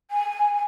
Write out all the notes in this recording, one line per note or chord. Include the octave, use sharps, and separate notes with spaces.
G#5